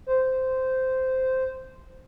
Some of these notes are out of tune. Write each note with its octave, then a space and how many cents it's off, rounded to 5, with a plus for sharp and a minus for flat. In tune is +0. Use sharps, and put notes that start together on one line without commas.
C5 -10